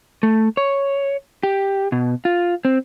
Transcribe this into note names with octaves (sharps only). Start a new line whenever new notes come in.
A3
C#5
G4
B2
F4
C4